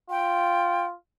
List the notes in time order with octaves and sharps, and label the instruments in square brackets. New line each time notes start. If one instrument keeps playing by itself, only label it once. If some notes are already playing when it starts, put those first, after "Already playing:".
[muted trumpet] F4 [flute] G5